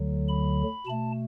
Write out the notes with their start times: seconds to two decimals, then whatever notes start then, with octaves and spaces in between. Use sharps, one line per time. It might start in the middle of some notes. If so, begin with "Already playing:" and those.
Already playing: D2 D3 F#3
0.29 B5
0.86 B2 A3 A5